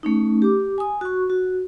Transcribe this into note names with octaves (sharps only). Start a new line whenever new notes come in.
A3 C#4 D#4
G4 D6
G#5 D#6
F#4 C#6
F#4